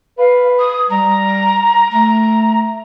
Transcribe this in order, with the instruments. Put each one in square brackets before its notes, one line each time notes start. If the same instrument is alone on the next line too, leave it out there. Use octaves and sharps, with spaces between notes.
[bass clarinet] B4 [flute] F5
[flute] D#6
[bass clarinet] G3 [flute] A#5
[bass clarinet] A3 [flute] A#5